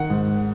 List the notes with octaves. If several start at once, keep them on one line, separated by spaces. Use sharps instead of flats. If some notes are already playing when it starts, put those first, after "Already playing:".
Already playing: D#3 F#5
G#2